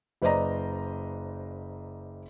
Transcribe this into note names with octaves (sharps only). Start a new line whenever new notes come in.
F#1 B4 C5 D5 D#5 A#5